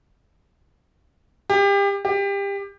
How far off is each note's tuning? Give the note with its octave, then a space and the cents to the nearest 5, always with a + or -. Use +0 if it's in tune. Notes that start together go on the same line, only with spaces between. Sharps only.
G4 +30
G4 +25